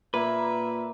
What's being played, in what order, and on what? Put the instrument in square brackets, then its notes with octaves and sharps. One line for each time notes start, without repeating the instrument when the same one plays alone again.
[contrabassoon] A#2 [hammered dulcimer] A#3 [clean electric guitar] B4 [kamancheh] E5